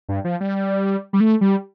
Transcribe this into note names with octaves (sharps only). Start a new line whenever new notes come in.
G2
F3
G3
G3
A3
G3